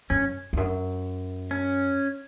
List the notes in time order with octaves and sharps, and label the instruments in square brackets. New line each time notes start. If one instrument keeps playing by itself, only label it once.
[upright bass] F#2 [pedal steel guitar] C#4
[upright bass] E2
F#2
[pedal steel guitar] C#4